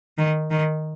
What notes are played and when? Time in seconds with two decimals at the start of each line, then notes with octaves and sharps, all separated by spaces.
0.18 D#3
0.51 D#3